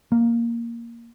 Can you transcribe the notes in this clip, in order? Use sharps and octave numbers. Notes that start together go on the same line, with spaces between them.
A#3